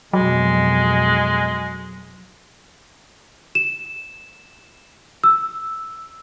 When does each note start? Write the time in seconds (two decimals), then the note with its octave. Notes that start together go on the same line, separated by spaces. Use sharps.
0.13 F2 B2 F#3 G#3
3.55 E7
5.24 E6